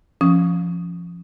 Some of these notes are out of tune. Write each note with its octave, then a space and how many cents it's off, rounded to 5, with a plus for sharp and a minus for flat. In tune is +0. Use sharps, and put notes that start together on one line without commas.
F3 -10 C#4 +0 D#6 +0